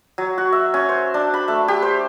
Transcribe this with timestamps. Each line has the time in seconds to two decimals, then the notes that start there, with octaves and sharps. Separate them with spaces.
0.18 F#3
0.38 F#4
0.52 E5
0.74 C#4
0.89 C5
1.14 D4
1.34 B5
1.48 A3
1.68 G4
1.82 C5